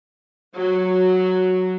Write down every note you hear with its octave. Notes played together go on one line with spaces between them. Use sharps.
F#3